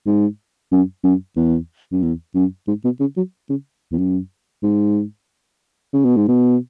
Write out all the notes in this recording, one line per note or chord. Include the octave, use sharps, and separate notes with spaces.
G#2
F#2
F#2
E2
F#2
E2
F#2
G#2
B2
C#3
F#3
C#3
E2
F#2
G#2
C#3
B2
G#2
B2